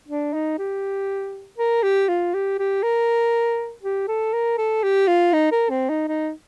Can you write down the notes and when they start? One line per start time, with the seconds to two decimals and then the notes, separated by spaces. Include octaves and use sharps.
0.09 D4
0.34 D#4
0.58 G4
1.58 A#4
1.83 G4
2.08 F4
2.34 G4
2.59 G4
2.83 A#4
3.83 G4
4.08 A4
4.33 A#4
4.58 A4
4.83 G4
5.08 F4
5.33 D#4
5.52 A#4
5.70 C4
5.89 D#4
6.08 D#4